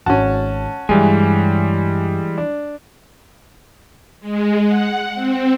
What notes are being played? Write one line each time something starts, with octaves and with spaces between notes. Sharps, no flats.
G#1 C#4 F#4 A5
G2 E3 G3 G#3 G#5
D4
G#3
F#5
C4